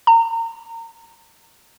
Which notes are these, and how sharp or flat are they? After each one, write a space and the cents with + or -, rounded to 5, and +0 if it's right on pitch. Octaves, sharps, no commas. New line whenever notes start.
A#5 -30